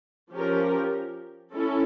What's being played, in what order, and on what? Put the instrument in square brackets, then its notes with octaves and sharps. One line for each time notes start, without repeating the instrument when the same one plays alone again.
[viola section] F3 C#4 G4 A#4
C#4 E4 A4